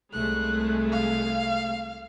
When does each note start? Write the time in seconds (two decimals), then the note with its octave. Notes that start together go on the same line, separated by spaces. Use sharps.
0.13 C2 G#3 A3 F#6
0.92 F5